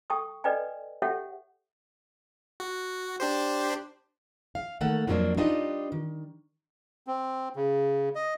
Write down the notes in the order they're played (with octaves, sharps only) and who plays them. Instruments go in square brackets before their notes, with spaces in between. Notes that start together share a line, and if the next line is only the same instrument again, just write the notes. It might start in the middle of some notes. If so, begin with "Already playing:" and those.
[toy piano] A4 G5 A5 C#6 D#6
A4 B4 D5 D#5 G5 G#5
G4 A4 C#5 E5 F#5 G5
[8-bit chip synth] F#4
D4 G4 C5
[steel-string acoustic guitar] F5
D#3 A3 A#3 A4 F#5
F2 F3 F#3 A#3 D4
D4 D#4 F4 G4 B4 D#5
D#3
[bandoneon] C4
C#3
D#5